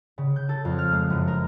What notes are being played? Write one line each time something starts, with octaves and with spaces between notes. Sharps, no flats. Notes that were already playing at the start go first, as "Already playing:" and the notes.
C#3
G6
A4
F2
F6
G#3
F#1
A#4